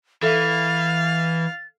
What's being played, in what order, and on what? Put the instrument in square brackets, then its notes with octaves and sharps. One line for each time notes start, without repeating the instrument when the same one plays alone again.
[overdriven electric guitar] E3 [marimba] A4 E5 [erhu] F5 [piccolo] A6